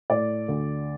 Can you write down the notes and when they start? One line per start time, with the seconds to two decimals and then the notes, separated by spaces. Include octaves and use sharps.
0.10 A2 D5
0.48 D2